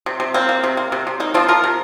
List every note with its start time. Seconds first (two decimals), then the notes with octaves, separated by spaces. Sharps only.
0.06 C3
0.20 C3
0.34 A#3 C4
0.49 A#3
0.64 C3
0.77 A#3
0.92 C3
1.07 C3
1.20 A#3 D#4
1.34 F3 C4 F4
1.49 F3 F4 A#4
1.64 C3